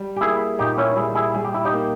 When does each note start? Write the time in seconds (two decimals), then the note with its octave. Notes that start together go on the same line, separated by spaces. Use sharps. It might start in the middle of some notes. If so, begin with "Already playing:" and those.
Already playing: G3
0.17 G4
0.21 A#3 E4 G#4
0.59 A#2 D#4 G4
0.77 C#4 E4
0.96 G3 E4 G#4
1.15 E4 G#4
1.34 G3 G#4
1.45 G4
1.54 E4
1.65 D#4 G4
1.73 A#3